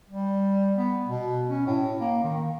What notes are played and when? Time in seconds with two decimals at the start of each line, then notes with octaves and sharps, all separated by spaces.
0.10 G3
0.76 B3
1.07 B2
1.50 C#4
1.67 A2
2.01 A#3
2.24 D#3